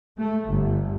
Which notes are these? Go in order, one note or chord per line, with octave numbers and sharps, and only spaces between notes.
A3
G1